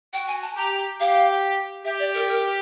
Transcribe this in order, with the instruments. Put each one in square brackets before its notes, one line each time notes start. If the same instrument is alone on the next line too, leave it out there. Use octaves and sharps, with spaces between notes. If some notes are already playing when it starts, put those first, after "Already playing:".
[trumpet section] F#4 [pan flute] G5
[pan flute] G#5
A5
[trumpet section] G4 [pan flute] A#5
[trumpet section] G4 [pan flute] F5
[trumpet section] G4 [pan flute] E5
[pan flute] D5
A#4
A#4